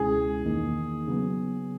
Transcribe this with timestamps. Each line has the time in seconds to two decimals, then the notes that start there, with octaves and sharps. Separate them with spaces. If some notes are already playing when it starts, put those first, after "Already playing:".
Already playing: C#2 B2 G#3 C#4 E4 G#4
0.44 E2 D#3 A#3 D#4
1.07 C#3 F#3 B3